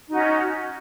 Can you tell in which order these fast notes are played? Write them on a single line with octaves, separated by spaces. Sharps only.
D#4 F#4 C#4